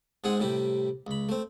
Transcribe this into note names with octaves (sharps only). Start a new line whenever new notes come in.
G#2 G#3 C4 G#4 F#5
A2 C3 G3 E4 G4
C#2 B5
A3 C4